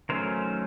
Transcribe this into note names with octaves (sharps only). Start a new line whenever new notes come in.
D#3 F#3 A3 C#4 A#4 C5